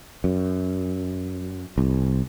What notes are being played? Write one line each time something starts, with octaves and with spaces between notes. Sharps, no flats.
F#2
C2